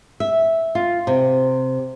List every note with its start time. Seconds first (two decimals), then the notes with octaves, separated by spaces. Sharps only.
0.20 E5
0.75 F4
1.07 C3